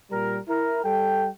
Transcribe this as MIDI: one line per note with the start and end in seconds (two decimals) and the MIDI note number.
0.11 0.38 46
0.11 0.38 55
0.11 0.38 70
0.48 0.79 64
0.48 0.79 70
0.84 1.28 55
0.84 1.28 69
0.84 1.28 79